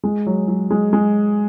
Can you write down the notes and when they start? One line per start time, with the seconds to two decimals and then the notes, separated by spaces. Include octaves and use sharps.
0.04 G#3
0.26 F#3
0.48 F#3
0.70 G#3
0.93 G#3